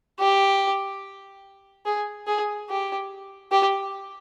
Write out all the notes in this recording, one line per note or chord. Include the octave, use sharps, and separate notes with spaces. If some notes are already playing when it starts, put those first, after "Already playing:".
G4
G#4
G#4
G4
G4